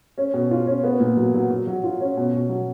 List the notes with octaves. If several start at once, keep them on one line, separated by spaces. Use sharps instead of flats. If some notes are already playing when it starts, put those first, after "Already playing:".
C#4
B2
F4
C#4
B3
A#2
F#3
F#3
F#3
F#3
F4
C#4
B2
B2
F#3